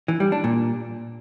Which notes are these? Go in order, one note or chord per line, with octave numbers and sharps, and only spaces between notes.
E3
G3
D4
A#2